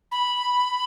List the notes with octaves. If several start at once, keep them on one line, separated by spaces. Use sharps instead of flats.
B5